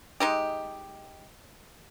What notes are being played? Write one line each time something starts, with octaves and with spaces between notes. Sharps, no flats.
G#3 D#4 G4